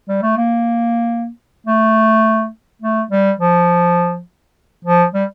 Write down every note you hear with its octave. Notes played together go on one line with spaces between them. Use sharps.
G3
A3
A#3
A3
A3
G3
F3
F3
G3